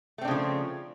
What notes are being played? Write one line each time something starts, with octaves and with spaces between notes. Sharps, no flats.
C#3 F3 A3 C4 D4